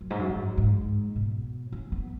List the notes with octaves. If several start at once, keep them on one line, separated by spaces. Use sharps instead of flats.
F#2
G#2
F#2
G#2
G#2
B2
C#4
B3